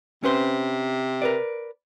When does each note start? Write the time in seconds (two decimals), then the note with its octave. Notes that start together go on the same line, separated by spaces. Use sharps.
0.24 C3 C#4 B4 C5
1.22 A#4 B4 D5